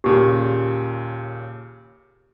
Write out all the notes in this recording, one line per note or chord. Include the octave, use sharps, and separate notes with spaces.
D#2 A#2 C#3 G4